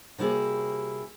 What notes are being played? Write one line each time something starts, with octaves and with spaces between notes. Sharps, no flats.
C3 G3 A#3 E4 F#4 G#4